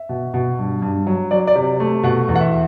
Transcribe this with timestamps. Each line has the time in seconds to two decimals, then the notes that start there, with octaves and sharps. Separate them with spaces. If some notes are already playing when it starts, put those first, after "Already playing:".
Already playing: E5
0.09 B2
0.34 B2
0.59 G2
0.82 G2
1.07 F#3
1.31 F#3 D5
1.47 D5
1.55 C3
1.80 A3
2.03 B2 F#5
2.28 E2
2.35 F#5
2.41 E5